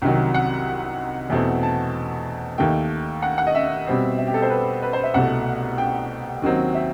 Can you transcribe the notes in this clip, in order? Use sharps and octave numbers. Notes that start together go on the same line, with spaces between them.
C2 C3 D#3 F#3 G5
F#5
E2 B2 A3 C4
A5
D#2 D#3 A3 G5
F#5
F#5
D#5
E5
B2 G3 C4
E5
G4
A4
C5
B4
B4
C5
E5
C2 B2 A3 F#5
G5
D#2 D#3 F#3 C4
E5